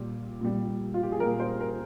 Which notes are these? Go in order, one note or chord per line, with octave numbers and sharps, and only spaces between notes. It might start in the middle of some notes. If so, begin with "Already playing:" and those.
Already playing: A#2 G3
A#2 G3
F4
G4
G#4
A#2 G3 A#4
C5
A#4